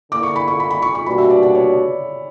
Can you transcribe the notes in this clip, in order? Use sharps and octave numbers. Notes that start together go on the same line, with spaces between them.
D3 A#3 E4 D6
C#6
B5
C#6
B5
B5
C#6
C#6
B2 G3 A#3 D4 F#4 B5
E5
D5
D5
C#5